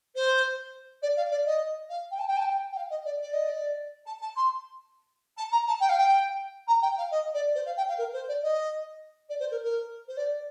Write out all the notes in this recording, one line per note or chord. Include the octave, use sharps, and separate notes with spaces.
C5
D5
F5
D5
D#5
F5
G5
A5
G5
A5
G5
G5
F5
D#5
D5
D5
D#5
D5
A5
A5
C6
A5
A#5
A5
G5
F5
G5
A#5
G5
F5
D#5
D5
C5
F5
G5
F5
A#4
C5
D5
D#5
D5
C5
A#4
A#4
C5
D5